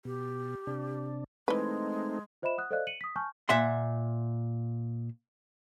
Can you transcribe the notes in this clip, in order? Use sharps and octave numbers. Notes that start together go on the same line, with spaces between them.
B2 G4
C3 D4
E3 G#3 A3 C4 D#4 B4
F4 C5 D#5 E5 B5 E7
F#5 D#6 F#6
A4 C5 D5 D#5 F5 F#6
C#7 D#7 F#7
D#6 B6
G#5 A5 C#6 F6 G6
A#2 E5 F#5 C6